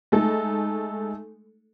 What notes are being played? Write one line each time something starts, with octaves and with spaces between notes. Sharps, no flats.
G#3 A3 D#4 A4